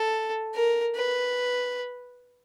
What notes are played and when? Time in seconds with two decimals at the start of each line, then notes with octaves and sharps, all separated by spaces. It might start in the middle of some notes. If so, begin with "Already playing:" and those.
Already playing: A4
0.55 A#4
0.95 B4